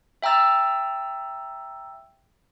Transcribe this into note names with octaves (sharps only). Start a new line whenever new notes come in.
E5 G5 A#5 E6 A6